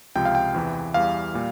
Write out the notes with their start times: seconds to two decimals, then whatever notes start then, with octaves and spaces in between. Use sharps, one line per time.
0.16 C#2 C3 F3 G5
0.25 F5
0.35 G5
0.54 E2 C3 E3
0.94 E2 E3 G3 F5
1.34 A#2 G3